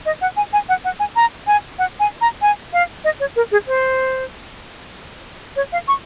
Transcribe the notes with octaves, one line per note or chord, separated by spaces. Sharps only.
D#5
F#5
G#5
G#5
F#5
F#5
G#5
A#5
G#5
F#5
G#5
A#5
G#5
F5
D#5
C#5
A#4
G#4
C5
C#5
F5
C#6